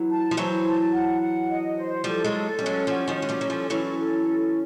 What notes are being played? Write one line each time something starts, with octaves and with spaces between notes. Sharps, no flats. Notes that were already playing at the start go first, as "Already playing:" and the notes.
Already playing: E3 F#3
A5
F3
E3 F#3 C5
A5
F#5
F#5
D#5
C5
F3 G3 A4
F#3 G#3
A4
G3 C#4
F#3 G#3
F3 G3 F#4
D#3 F3
C#4
G#3
F3 G3
F#3 A4
F3 G3
E3 F#3 C#4
A4
C#4